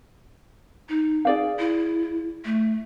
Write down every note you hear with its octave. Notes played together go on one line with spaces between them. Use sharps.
D#4
G#4 D5 F5
E4
A3